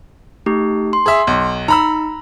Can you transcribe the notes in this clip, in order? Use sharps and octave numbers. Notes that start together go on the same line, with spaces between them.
A3 D#4 G4
C6
G#4 E5
B1
D#4 A#5 B5 E6